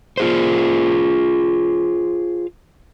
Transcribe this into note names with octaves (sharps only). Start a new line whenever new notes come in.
F4 G#4 C5